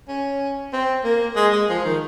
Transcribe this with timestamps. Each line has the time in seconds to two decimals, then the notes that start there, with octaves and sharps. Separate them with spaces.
0.08 C#4
0.73 C4
1.04 A#3
1.36 G#3
1.53 G#3
1.69 F3
1.85 D#3